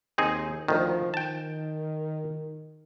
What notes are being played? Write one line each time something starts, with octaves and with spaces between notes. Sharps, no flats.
D#2 C4 D#4 G#4
D2 D#3 F3
D#3 G5 A5